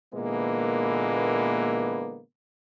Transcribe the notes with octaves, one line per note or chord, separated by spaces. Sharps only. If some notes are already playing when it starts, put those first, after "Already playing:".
A#2 D3 E3 G#3 A#3 B3